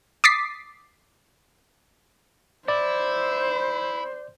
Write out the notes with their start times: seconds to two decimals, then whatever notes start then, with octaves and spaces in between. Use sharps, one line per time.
0.24 D6 D#6 A6 B6 C7
2.68 E4 C5 D5